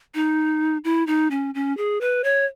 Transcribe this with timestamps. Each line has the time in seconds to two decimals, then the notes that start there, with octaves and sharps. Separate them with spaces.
0.15 D#4
0.84 E4
1.07 D#4
1.31 C#4
1.55 C#4
1.77 G#4
2.01 B4
2.24 C#5